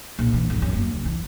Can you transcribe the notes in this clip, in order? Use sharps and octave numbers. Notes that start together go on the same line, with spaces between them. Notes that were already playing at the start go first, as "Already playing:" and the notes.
A#1
E3
G1
F#2
A#3
C#2
E3